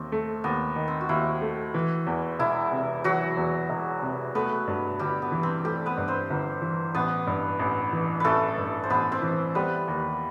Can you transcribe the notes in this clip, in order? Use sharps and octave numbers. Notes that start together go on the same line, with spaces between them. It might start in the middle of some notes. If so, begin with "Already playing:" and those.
Already playing: D#2 C4
A3
D#2 B3
D#3
C4
F#4
D#2 E4
A3
E3
E2
E1 E4
C3
E3 F#3 F#4
E2
E1
C3
A3 B3 B4
G2
G1 G3 G4
B3
E3
C4
G3 A3 G4
B3 B4
G2
C4 C5
G1
E3
A1 B3 B4
G2
A1
E3
A1 A3 A4 B4
G2
C5
A1 B3 B4
C4 C5
E3
G3 B3 B4
D#2